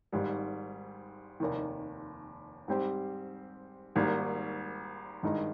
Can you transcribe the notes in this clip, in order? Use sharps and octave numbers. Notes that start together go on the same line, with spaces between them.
G#1 G#2 G3
F1 D#2 D#3
G#2 G3 C4 G4 C5
G#1 G#2 G3 A#3
G#1 G2 D#3 G#3 D#4